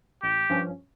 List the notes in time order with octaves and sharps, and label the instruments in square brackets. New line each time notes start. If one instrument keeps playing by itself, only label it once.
[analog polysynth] A1 [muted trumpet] G4
[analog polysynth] G2 F3 C#4